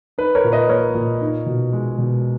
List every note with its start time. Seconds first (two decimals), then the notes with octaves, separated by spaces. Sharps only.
0.18 D#4 B4
0.35 A#4 C#5
0.44 A#2
0.52 B4 D#5
0.69 A#3 A#4 C#5
0.95 A#2
1.21 D#4
1.46 B2
1.73 G#3
1.98 B2